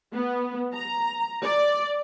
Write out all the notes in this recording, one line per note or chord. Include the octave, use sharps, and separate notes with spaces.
B3
A#5
D5